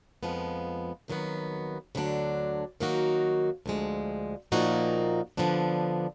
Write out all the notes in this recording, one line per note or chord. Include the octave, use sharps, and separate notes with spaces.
F2 F3 G#3 B3
F2 D#3 F#3 B3
D2 D3 F#3 D4
D#3 F#3 A#3 D#4 F#4
D2 D3 F3 G#3
A#2 F3 A#3 D#4 F#4
D3 F3 B3 D4